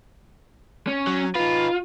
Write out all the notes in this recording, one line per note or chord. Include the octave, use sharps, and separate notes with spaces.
C#4
F#3
D#4 F4 B4